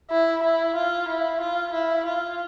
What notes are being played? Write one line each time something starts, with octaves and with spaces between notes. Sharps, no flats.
E4
E4
F4
E4
F4
E4
F4